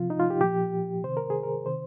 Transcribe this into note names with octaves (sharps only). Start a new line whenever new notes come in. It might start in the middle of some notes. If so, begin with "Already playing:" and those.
Already playing: C3 F3 F4
D#4
F4
G4
A#2 F3 G4
C3 D#3 C5
A#4
G#4
A#4
C3 D#3 C5